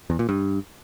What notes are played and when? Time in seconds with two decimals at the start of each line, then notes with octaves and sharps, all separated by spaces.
0.10 E2
0.19 A#2
0.29 G2